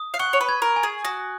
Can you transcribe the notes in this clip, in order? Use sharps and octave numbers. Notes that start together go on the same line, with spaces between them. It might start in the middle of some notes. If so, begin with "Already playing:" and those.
Already playing: D#6
F5
F#5 C#6
C#5
B4
G#6
A#4
G#5
G#4
F#4 D#6